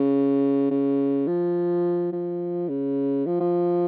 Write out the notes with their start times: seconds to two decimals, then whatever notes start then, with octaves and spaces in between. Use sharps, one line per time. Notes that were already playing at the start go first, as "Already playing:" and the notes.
Already playing: C#3
0.71 C#3
1.27 F3
2.12 F3
2.69 C#3
3.26 F3
3.40 F3